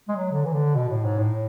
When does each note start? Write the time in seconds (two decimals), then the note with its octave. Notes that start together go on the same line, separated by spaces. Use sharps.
0.08 G#3
0.16 F#3
0.31 D3
0.45 E3
0.53 D3
0.75 B2
0.89 A2
1.04 G#2
1.18 A2